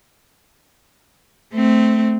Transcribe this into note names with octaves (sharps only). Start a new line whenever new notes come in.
A3 C4